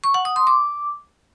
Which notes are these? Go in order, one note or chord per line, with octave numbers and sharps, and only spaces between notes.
C#6
F#5
D#6
C6
D6